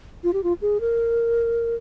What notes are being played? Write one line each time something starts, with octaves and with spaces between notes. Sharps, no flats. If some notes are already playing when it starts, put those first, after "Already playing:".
F4
G4
F4
G#4
A#4